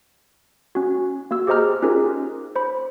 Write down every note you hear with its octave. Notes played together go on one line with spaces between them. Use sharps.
C#4 F#4
A#3 F#4 E6
G4 G#4 C5 D#5 A#5 F6
C#4 D#4 F4 G4 G#4 A#4
C5 B5